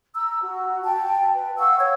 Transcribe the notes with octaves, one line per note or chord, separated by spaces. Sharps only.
A#5 E6
F#4
G5 A5
B4
F5 F#5 C#6 E6
C#5 G#6